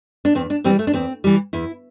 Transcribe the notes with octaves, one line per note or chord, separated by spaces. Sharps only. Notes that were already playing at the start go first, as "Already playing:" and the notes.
D4
E2 C4
D4
E3 G3 C4
A3
D4
E2 C4
E3 G3
E2 E4